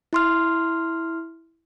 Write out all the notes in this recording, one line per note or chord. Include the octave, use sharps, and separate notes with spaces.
E4 C6 F6